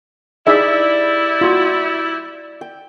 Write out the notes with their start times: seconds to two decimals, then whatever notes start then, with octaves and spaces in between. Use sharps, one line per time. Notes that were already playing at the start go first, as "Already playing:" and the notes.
0.47 G3 D#4 E4 G#4 D5 E5
1.41 F4 F#4
2.61 G5